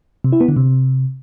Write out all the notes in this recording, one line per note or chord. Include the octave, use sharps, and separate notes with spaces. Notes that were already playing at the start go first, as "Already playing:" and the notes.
C3
E4
B3
D3
C3